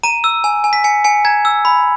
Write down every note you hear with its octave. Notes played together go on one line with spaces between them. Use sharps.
A#5 D#7
E6
G#5
G#5
B6
G#5 C#7
G#5 C#7
A#5 G#6
E6
B5